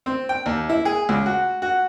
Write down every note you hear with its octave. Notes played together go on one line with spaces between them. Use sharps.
C4
G5
D#2
E4
G#4
C#2
F#4
F#4